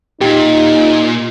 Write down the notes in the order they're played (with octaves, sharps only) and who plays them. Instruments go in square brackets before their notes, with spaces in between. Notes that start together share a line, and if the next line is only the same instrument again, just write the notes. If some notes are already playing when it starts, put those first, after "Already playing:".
[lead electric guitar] A#2 [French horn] D#4 [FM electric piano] G4